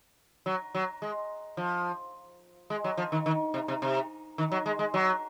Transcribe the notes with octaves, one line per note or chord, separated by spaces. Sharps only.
F#3
F#3
G#3
F3
G#3
F#3
F3
D#3
D#3
C3
C3
C3
D#3
F#3
G#3
G#3
F#3